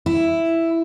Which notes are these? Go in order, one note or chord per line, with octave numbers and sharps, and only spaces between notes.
E4